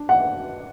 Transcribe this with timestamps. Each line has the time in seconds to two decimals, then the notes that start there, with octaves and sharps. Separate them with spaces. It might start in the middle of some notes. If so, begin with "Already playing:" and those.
Already playing: D4
0.09 F#5